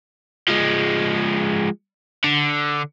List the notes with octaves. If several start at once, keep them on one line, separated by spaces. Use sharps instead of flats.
F3 G#3
D3